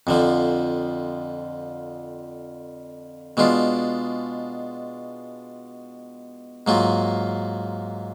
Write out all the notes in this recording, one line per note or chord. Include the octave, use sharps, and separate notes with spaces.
F2 D3 F3
B2 G#3 D4 F4
G#2 F#3 A#3 F4